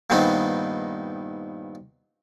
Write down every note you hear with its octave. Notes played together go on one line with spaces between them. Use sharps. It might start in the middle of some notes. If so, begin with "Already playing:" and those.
G2 A#2 D#3 B3 C4 D#4